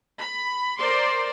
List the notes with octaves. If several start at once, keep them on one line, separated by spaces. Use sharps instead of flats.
B5
A#4 C5 D5 C6